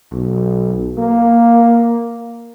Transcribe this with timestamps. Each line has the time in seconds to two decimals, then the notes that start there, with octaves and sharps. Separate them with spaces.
0.12 B1
0.98 A#3